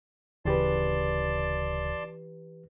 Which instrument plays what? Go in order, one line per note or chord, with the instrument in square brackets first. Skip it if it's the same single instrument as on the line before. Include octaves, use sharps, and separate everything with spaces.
[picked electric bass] D1 C#3 [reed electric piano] E3 G4 B4 [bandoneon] D5 A5 C6